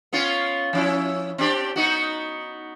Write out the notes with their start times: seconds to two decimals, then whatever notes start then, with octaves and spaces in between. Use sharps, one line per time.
0.13 B3 C#4 F4
0.73 F3 C#4 E4
1.38 C4 D4 G4
1.76 B3 D#4 F#4